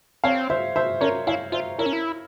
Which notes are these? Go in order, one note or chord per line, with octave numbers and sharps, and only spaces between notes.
C4 C#5 F5
C5 E5
C5 E5
C#4 A#4 C#5
E4 C#5 F5
F4 C5 E5
E4 A#4 C#5
C#4
E4